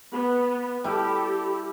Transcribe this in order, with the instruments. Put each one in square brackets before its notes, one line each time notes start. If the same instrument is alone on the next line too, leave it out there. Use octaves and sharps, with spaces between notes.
[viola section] B3
[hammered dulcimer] G3 E4 [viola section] G4 A4